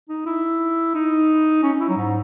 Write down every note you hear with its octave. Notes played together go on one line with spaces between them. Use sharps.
D#4
E4
D#4
C#4
E4
F#3
G#2